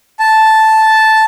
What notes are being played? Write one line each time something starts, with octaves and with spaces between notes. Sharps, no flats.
A5